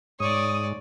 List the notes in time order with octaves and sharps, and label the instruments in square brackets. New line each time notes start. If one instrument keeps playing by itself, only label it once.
[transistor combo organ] G#2 [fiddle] C#5 D5 [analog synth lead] D#6